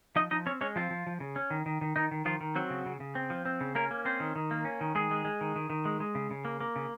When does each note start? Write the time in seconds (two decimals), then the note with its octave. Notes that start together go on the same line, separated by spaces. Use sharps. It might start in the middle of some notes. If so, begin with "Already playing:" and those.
0.16 F3 D#4 D#5
0.31 F3 D#4 D#5
0.46 C4 C#4 C#5
0.61 G#3 C#4 C#5
0.76 F3 C4 F4
0.91 F3
1.07 F3
1.20 C#3
1.36 C#4
1.50 D#3
1.66 D#3
1.81 D#3
1.96 D#3 D#4
2.11 D#3
2.25 D#3 F3 F4
2.41 D#3
2.55 F#3 C4 F#4
2.70 C#3
2.86 C#3
3.00 C#3
3.15 C4
3.30 F3
3.46 C4
3.61 C#3
3.75 A#3 C#4 A#4
3.91 A#3
4.05 C4 C#4 C5
4.20 D#3
4.36 D#3
4.51 A#3
4.65 C#4
4.81 D#3
4.95 D#3 G#3 G#4
5.11 G#3
5.25 G#3
5.41 D#3
5.56 D#3
5.70 D#3
5.85 G#3
6.00 G#3
6.15 C#3
6.31 C#3
6.45 A#3
6.61 A#3
6.76 C#3